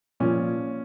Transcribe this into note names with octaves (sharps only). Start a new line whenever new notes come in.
A#2 F3 C#4